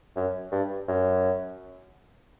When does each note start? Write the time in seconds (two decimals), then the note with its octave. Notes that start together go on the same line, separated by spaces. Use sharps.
0.16 F#2
0.52 G2
0.88 F#2